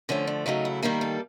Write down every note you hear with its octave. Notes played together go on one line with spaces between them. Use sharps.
D3 F3 A3 C#4
D4
C#3 F#3 A3 D#4
E4
D#3 G3 A#3 E4
A4